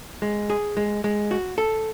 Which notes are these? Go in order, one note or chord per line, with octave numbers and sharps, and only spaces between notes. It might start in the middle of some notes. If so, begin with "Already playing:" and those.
G#3
G#4
G#3
G#3
F#4
A4